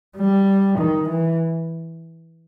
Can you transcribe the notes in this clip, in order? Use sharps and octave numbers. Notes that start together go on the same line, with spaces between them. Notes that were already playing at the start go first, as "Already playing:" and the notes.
G3
D#3
E3